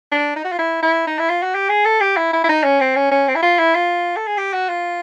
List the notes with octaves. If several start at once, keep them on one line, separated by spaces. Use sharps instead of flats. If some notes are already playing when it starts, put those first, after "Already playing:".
D4
D#4
F#4
F4
E4
E4
D#4
E4
F4
F#4
G4
G#4
A4
G4
E4
E4
E4
D#4
C#4
C4
C#4
C#4
C4
E4
F4
E4
F4
A4
G#4
G4
F#4
F4